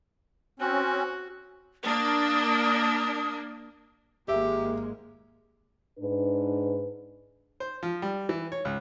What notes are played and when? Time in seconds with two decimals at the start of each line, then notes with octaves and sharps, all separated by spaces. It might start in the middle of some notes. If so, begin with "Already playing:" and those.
0.60 C4 C#4 F#4
1.84 A#3 D4 D#6
4.28 G#1 G#3 A#3 G4 E5
5.99 G#2 D4 B4
7.60 C5
7.83 F3
8.02 G3
8.29 E3
8.52 C#5
8.65 C#2